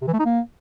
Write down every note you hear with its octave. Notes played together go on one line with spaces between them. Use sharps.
C3
E3
A3
D#4
A#3